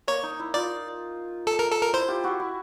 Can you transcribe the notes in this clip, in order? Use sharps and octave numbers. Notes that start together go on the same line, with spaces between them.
A#3 C#5
D#4
E4
D#4 F4 D5
A4
A#4
A4
A#4
E4 C5
F4 G4
E4 F#4
E4